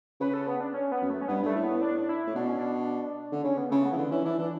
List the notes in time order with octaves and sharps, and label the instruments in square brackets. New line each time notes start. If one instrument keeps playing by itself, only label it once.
[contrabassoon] C#3 [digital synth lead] B4
[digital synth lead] A4
B3
D4
C#4
B3
[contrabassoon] F#2
[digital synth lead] A3
C#4
[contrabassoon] G2 [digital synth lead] B3
[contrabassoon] G2 [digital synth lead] A3
[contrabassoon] A2
[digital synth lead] B3
D4
D4
E4
[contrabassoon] A2
[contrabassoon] B2 [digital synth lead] D4
[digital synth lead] C#4
D4
[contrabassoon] D3
[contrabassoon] C#3 [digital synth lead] C#4
[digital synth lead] B3
[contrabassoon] C#3 [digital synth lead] A3
[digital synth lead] B3
[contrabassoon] E3
[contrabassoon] D3 [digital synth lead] B3
[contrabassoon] E3 [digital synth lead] C#4
[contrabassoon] E3 [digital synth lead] D4
[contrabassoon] E3 [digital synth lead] D4